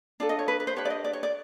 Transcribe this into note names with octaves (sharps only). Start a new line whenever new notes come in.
D4 F4 A4 D5
D#5
C#5
B4
B4
C5
D4 G4 B4 C#5
D5
D#5
D5
C#5
D5